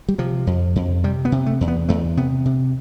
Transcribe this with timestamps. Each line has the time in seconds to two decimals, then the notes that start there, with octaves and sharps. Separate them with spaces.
0.09 G3
0.18 C3 F3
0.47 F2
0.76 F2
1.04 C3 G3
1.25 B3
1.32 C3
1.46 A3
1.61 E2
1.68 B3
1.89 E2 A3
2.17 C3 B3
2.45 C3